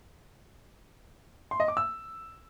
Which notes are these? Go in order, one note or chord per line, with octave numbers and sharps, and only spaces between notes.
C6
D#5
D6
E6